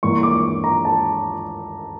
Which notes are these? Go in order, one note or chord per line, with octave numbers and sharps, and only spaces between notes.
G2 E3 A#3 D4 C#6
C#6
D6
A#5
A5